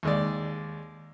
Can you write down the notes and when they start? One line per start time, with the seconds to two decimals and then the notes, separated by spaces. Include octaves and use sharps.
0.03 D#2 G#3 D5